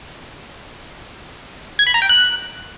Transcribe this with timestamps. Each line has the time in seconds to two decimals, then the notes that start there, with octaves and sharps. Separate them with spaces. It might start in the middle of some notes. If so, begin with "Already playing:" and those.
1.79 G#6
1.87 B5
1.94 A#5
2.02 G5
2.09 F#6